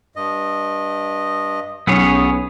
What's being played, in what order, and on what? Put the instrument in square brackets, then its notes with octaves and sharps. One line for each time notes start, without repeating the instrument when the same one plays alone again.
[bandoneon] G2 D#5
[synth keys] B1 C#4 [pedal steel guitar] B3 G#4 C#5